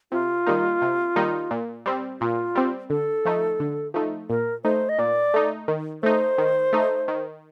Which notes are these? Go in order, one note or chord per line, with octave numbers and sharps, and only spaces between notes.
C3 F4
D#3 G3 A#3 D#4
C3
D#3 G3 A#3 D#4
A#2
G3 C4
A#2 F4
G3 C4
D3 A4
F3 A3 D#4
D3
F3 A3 D#4
A#2 A#4
A3 D#4 C5
D#5
A#2 D5
A3 D#4
D#3
A3 D#4 C5
D#3
A3 D#4
D#3